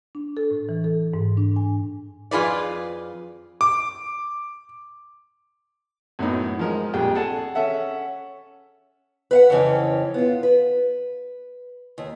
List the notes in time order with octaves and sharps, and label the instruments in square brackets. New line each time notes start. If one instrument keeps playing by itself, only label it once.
[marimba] D4
A4
A2
E3
A4
G#2
D4
G#5
[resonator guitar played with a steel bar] F2 F4 G#4 B4 D5
[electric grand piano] D6
[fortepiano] F#2 A2 B3 D#4
F3 G#3 A#4 D#5
A#1 F2 C3 G3 G#4 G5
G#4 A4 F#5 A5
C#4 A4 E5 F#5
[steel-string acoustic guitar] B4 F5 F#5
F2 C#3 E3 C4 C#4
B3 F4
B4
D#2